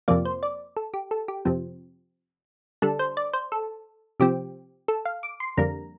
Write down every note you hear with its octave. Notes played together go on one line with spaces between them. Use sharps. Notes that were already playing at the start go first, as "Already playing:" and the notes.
F2 C3 F3 A#3 D5
C5
D5
A4
G4
A4
G4
F2 C3 F3 C4
D3 G3 D4 A4
C5
D5
C5
A4
C3 F3 C4 G4
A4
F5
D6
C6
F2 D3 G3 A#3 A#5